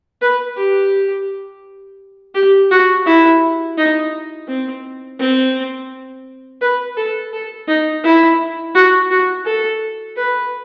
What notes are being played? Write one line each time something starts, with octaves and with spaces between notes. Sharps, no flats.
B4
G4
G4
F#4
E4
D#4
C4
C4
B4
A4
A4
D#4
E4
F#4
F#4
A4
B4